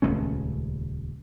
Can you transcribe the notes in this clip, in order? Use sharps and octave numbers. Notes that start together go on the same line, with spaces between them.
D#1 C#2 A3 C#4